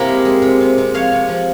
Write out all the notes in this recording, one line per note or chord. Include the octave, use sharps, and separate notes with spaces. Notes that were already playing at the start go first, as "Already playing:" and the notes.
Already playing: C3 A#3 E4 G4 A#4
G#3
G#3
C3
C3
C3
F3 C#5 F5
C3
F3